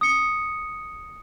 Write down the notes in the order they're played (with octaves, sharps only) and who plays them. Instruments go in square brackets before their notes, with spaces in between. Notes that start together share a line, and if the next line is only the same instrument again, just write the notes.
[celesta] D#6 C#7